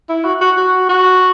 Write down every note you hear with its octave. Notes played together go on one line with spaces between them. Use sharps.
E4
F#4
F#4
F#4
F#4